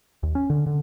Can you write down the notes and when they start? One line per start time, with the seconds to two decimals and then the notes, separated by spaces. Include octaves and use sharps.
0.23 D#2
0.35 C#4
0.50 D3
0.66 D3